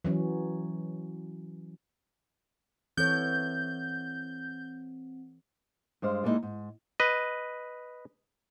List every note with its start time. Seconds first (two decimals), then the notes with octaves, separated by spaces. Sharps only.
0.04 E3 F#3 C#4
2.97 E3 C4 A4 C#5 G6
6.02 G2 G#3 C5 F5
6.23 G3 G#3 A#3 B3 D#4 E4
6.43 G#2
7.00 B4 D#5